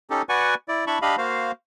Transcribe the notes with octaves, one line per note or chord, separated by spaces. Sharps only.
C#4 D#4 G4 A4
F#4 B4 D5 F#5 G#5 C#6
E4 D5
D4 E4 A5 B5 C#6
D4 G4 D#5 F5 B5
A#3 F#4 C5 F5